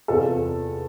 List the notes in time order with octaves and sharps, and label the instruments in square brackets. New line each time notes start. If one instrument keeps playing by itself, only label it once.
[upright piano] E2 C3 E3 F4 A4